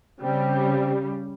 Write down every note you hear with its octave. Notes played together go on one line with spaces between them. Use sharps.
C#3 G3 C4